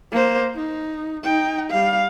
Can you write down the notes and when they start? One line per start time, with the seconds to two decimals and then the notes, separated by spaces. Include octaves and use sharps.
0.12 A#3 C5
0.55 D#4
1.24 D#4 G5
1.70 G3 F5